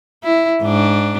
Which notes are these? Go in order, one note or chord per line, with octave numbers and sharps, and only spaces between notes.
E4
G#2 D4